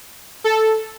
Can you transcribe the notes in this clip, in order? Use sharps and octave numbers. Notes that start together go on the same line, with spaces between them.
A4